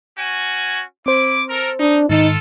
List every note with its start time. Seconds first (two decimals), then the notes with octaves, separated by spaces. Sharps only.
0.18 C#4 F#4 G#5
1.06 C4 E4 C5 D6
1.49 A4 A#4
1.80 D4 D#4
2.09 G#2 D#3 D#4 F4 A4 C#7